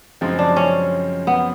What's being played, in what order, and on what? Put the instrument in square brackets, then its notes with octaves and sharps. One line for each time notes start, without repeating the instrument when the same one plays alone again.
[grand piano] F#2 C#3 F3 G#3 C4
[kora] D4
C#4
B3